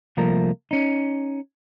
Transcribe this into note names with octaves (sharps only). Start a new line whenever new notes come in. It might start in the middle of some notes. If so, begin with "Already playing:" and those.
C2 F3 A3 A#3 A#4
C#4 D#4